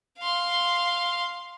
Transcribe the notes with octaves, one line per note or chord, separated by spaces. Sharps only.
F5 C6